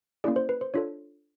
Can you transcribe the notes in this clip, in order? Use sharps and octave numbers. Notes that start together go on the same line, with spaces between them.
A#3 C#4 E4 G#4 D5
C5
B4
C5
D4 F4 A4 C#5